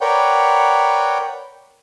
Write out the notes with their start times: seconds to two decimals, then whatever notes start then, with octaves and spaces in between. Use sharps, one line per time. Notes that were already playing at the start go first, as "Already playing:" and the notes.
0.01 A#4 B4 C#5 D5 F#5 G5